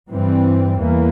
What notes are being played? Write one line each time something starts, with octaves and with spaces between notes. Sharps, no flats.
G2 E3 G3 C4
E2 E3 A#3